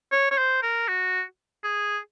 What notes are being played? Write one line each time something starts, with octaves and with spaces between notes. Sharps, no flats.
C#5
C#5
C5
A#4
F#4
G#4